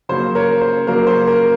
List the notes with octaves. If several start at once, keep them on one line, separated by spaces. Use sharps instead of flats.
C#3 F#3 A#3 C5
A#4 C#5
C5
C#3 F#3 A#3 A#4
C5
A#4